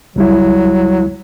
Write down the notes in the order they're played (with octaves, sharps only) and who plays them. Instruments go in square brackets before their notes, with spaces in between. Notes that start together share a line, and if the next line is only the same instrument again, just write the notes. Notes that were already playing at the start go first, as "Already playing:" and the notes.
[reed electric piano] C#2 G3 E4 [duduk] F#3